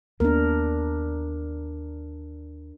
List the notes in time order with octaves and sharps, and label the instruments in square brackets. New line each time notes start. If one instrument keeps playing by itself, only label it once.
[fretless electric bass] D#2 A#3 B3 [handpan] D4 A#4